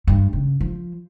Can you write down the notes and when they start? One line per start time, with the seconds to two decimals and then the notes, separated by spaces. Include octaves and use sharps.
0.07 G2
0.33 C#3
0.60 F3